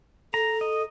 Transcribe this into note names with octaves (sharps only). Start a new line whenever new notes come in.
A4 A#5
D#5